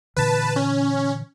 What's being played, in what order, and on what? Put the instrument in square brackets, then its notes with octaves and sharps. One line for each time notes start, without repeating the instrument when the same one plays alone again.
[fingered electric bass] A#2 D3 E3 [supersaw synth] B4 A5
[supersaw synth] C#4